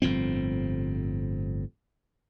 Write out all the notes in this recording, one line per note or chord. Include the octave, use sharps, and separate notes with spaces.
G1 A2 F3 C4